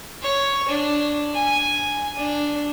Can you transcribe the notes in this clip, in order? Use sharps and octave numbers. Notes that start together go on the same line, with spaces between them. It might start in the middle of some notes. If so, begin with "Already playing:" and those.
C#5
D4
G#5
D4